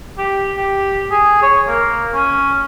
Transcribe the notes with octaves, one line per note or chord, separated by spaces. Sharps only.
G4
G4
G#4
C#5
A#3
C#4